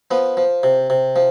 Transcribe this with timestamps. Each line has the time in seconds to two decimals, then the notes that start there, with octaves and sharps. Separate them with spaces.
0.11 F3 B3
0.37 F3
0.63 C3
0.90 C3
1.16 F3